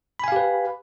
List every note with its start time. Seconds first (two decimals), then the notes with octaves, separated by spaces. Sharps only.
0.19 B5
0.24 G#5
0.28 F5
0.32 G4
0.36 B4